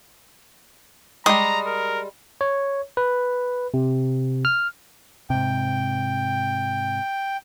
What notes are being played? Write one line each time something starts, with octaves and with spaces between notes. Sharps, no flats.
G3 G#3 A#5 D#6
A#4
C#5
B4
C3
F6
G#2 C3 G5